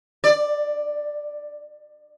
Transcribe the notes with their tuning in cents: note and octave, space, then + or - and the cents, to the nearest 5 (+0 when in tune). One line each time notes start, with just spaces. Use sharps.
D5 +10